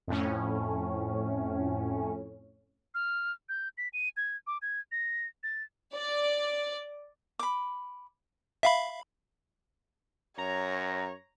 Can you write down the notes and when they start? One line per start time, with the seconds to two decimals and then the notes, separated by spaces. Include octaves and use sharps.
0.07 F2 A2 C#4
2.94 F6
3.49 G6
3.78 B6
3.93 D#7
4.17 G#6
4.47 D6
4.62 G#6
4.92 A#6
5.43 A6
5.94 D5
7.39 B5 D6
8.63 E5 F5 B5
10.38 F#2 C#5 A#5